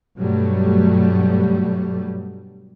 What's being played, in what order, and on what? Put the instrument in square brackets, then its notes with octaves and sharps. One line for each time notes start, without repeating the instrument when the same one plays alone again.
[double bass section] G2 B2 F#3 G3 A3